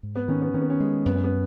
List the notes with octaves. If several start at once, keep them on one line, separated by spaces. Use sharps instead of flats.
G#2
B3
D#3 C#4
B3
D#3 C#4
B3
C#4
G#3
F#2 B3
C#4
B3